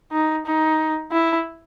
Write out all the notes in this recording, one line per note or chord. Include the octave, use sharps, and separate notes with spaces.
D#4
D#4
E4